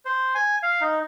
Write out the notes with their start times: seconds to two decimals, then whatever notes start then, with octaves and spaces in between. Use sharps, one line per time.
0.05 C5
0.35 G#5
0.63 F5
0.81 D#4